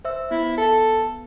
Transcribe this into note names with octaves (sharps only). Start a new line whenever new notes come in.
C5 E5 E6
B3 E4
A4